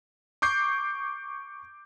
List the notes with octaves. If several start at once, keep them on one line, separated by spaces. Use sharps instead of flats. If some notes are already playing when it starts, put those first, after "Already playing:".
C#6 D6 G6 C7